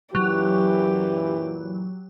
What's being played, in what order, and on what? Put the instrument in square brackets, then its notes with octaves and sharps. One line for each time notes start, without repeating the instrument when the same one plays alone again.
[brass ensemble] F#2 A#2 E3 [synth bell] F#3 [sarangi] G4